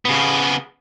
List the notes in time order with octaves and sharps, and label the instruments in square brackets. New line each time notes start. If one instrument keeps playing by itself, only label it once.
[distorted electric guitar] C#3 B3